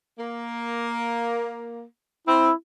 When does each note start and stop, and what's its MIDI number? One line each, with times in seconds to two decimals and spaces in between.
0.18 1.84 58
2.28 2.49 60
2.28 2.53 64